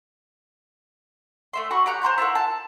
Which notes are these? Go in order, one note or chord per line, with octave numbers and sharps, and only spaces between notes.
A3 E5 C6
F#4 F#5 B5 C#6
G4 F#5 A#5 F#6
C5 A#5 C6 G6
E4 F4 A#4 F#5
A5